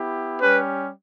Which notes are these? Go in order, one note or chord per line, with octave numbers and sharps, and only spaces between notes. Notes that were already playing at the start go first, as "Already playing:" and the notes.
Already playing: B3 E4 G4
G3 C#4 G4 B4